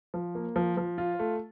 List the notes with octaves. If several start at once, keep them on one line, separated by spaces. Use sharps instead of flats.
F3
A#3
F3
F3
F4
A3